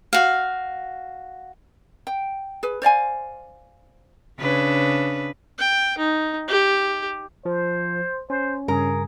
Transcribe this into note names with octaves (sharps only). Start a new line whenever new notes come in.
F#4 F5
G5
G#4 B4
C5 D5 F5 G#5
C#3 D4 B4
G5
D#4
G4
F3 C5
C#4 C5
G2 C#3 G#4 A#4